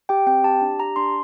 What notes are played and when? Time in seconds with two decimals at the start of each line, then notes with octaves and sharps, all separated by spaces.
0.09 G4 G5
0.27 C4 G5
0.44 G4 A5
0.62 D4
0.80 G4 A#5
0.96 D4 C6